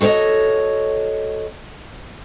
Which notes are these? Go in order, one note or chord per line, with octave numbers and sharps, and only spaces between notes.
F#4 A4 C5 C#5 D#5